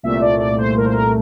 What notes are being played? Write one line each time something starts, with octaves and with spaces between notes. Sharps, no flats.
C2 A#2 A3 E5
D5
D5
C5
A#4
C5
A#4